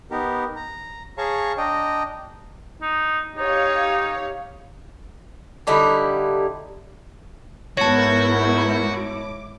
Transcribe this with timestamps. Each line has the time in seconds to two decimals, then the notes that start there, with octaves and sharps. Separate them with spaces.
0.11 B3 D#4 G4 A#4
0.56 A#5
1.18 G#4 C#5 F5 A5 A#5 C#6
1.57 D4 D#5 G5 A#5
2.82 D#4
3.37 D#4 G4 C#5 F5
5.67 D3 G3 D#4 E4
7.77 G#2 B3 E4 F#4 A#4 C#5 A5 G6
8.77 D6